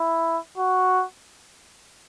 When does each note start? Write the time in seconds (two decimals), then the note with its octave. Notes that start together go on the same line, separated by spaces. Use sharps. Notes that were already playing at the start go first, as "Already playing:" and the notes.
Already playing: E4
0.58 F#4